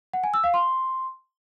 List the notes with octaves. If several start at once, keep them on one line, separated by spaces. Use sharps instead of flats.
F#5
G#5
E6
F5
C6